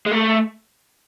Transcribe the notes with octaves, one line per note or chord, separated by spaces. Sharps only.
G#3
A3